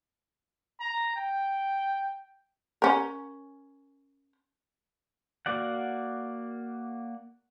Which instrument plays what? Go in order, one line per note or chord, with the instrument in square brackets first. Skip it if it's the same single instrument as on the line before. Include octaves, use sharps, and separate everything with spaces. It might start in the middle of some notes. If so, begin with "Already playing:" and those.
[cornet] A#5
G5
[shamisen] C#4 A#4
[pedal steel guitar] A#3 F#4 D5 F#5